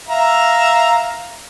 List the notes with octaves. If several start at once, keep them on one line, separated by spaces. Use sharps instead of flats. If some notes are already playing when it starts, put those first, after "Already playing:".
E5 F5 A#5